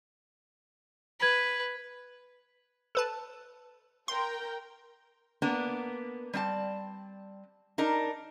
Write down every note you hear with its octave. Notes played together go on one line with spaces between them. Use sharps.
B4 G#6 B6
A4 B4 A5
A#4 G5 C6
A#3 B3 D4
G3 C4 D5 A5
D4 D#4 A#4